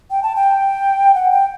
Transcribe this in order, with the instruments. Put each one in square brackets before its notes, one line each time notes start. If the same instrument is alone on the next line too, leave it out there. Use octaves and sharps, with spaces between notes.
[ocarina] G5
A5
G5
F#5
G5